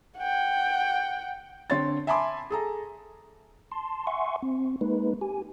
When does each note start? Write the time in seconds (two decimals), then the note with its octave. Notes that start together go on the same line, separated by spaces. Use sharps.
0.18 F#5 G5
1.70 D3 C4 C#5 C6 A6
2.07 E5 G#5 A5 B5 C6 D6
2.50 G#4 A4 A#5
3.72 A5 C6
4.07 E5 F#5 G#5 C6 C#6
4.42 C4
4.81 G#3 A#3 D#4 B4
5.21 G4 G#5